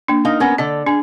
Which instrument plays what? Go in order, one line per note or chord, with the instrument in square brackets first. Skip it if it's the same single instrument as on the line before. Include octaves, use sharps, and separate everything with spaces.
[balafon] A#3 D4
[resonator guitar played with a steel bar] D#4 A#4 F5
B3 C#4 A#4
[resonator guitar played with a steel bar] D3 A4 [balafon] D#5
[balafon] D4 [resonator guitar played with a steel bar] G#4